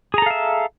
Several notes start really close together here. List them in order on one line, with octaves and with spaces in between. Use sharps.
G#4 A#5 A4 F5 E5